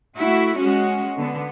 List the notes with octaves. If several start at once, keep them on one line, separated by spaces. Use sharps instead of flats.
A3 E4 F#4
G#3 C#4 F#4
D3 B3